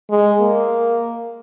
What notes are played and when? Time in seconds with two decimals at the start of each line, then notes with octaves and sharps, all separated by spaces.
0.10 G#3
0.40 A#3